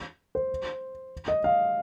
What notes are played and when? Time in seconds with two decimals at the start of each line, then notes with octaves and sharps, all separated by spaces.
0.35 C5
1.28 D#5
1.44 F5